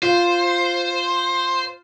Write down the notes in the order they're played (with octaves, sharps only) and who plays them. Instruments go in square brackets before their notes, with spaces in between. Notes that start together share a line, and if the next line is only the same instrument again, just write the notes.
[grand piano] F4 [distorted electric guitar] C5